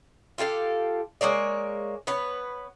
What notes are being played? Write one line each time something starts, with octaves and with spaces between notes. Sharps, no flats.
F4 G4 A4 F5
G#3 A#3 C#5 D5
B3 B4 C#5